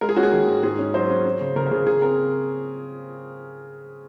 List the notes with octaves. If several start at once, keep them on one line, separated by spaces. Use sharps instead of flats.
G#3 A#4
G#4
C#4 F#4
G#4
D#3
G#2
G#2 G#4
C#4
F#3 C5
C#4
C#4
C#3
C#3 A#4
A#4
C#3 G#4
C#3 G#4
C4 A#4